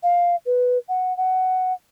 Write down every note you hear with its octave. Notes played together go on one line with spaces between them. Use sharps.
F5
B4
F#5
F#5